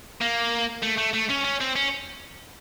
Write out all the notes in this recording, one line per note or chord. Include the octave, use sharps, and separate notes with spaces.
A#3
A3
A3
A3
C#4
C#4
C4
C#4